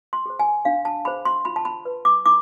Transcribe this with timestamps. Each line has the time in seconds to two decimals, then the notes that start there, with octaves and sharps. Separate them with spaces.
0.13 C6
0.26 G#4 C5
0.39 G#5
0.65 D4 F5
0.85 A5
1.05 G#4 C5 B5
1.25 C6
1.45 F4 B5
1.56 A5
1.65 B5
1.85 B4
2.05 D6
2.26 E4 D6